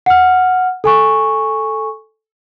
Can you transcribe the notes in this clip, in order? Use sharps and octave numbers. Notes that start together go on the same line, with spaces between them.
F#5 F6
A4 G#5 C#6